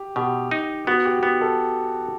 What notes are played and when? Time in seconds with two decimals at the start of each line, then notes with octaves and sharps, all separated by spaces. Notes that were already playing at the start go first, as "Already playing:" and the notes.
Already playing: G4
0.16 B2 G4
0.51 D#4
0.87 B3 F#4
1.05 G4
1.23 B3 G4
1.41 A4